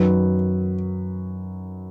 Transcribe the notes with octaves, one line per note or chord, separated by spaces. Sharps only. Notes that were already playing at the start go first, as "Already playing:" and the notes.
Already playing: F#2 D#3 F#3 B4